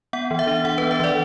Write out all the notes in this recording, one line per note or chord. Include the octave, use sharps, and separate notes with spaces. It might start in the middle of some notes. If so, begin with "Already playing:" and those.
B3 F#5
E3
E5
D4
E3 F#5
B3 B4
E5
E3 D5